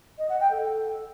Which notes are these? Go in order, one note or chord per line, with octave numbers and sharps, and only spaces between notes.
D#5
F#5
G5
A4